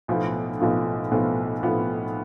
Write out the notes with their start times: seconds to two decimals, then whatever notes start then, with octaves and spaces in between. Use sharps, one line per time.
0.08 B1 A2 F3 B3 F4
0.60 B1 A2 F3 B3 F4
1.11 B1 A2 F3 B3 F4
1.63 B1 A2 F3 B3 F4